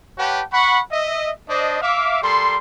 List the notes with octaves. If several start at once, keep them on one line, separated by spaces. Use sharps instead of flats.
G4 B4 C#5 F#5 G5 A5
F#5 B5 C#6
D#5 E5
D4 C5 D#5
E5 F5 D6
G3 A4 A#4 C6